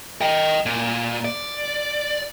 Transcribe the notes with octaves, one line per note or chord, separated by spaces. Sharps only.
D#5 G5
A#2
D5